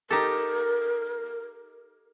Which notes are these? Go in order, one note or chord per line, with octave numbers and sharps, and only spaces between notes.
D#4 G4 A4 A#4